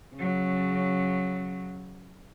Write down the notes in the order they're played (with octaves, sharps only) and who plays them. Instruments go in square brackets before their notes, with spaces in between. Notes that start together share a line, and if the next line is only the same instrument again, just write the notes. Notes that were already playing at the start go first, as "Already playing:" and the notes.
[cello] C#3 F#3